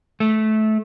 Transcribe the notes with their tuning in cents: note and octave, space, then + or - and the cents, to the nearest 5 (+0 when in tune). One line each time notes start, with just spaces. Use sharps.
A3 -20